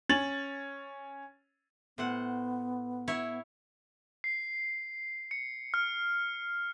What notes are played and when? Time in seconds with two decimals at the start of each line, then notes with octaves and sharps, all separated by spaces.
0.09 C#4 A6 F#7
1.98 A2 B3 C5 F#5
3.08 E4 C#5 E5
4.24 C7
5.31 C#7
5.74 F6